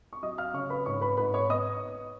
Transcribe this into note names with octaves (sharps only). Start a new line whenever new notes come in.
C#6
F#3 D#5 D#6
F5 F6
C#3 C#5 C#6
B4 B5
G#2 C#5 C#6
B4 B5
G#2 B4 B5
C#5 C#6
B3 D#5 D#6